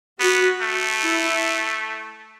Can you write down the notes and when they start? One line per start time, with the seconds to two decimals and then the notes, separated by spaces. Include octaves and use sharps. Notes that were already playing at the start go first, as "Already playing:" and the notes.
0.20 B3 F#4
0.61 A3
1.03 E4